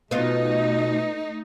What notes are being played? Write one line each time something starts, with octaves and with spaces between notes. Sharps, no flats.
B2 A3 B3 D#4 F4 D#5